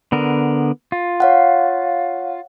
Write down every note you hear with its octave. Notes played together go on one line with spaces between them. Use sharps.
D3 B3 A#4
F4
C#5 F5 F#5